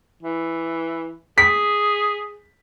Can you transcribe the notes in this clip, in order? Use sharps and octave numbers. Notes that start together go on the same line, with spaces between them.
E3
G#4 B6